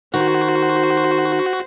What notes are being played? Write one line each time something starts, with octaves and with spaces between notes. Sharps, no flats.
D#3 F#4 C5